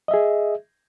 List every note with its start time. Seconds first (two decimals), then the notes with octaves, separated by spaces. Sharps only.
0.08 D#5
0.11 E5
0.14 G#4